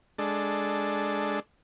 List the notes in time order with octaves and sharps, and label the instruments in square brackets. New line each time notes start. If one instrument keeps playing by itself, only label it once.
[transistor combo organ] G#3 D4 A4